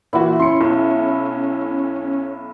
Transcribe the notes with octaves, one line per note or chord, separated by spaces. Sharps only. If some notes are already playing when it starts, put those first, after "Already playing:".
A#2 E3 E4 F#4
C#4 C6 C#7
B1